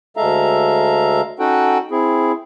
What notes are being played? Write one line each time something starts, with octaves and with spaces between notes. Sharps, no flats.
D2 G#3 A4 E5 F5 A#5
C#4 D#4 F#4 A4 F#5 G5
C4 E4 G#4